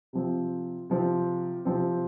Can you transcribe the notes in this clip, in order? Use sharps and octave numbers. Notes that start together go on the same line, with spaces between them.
C3 F3 C4
C3 F3 C4
C3 F3 C4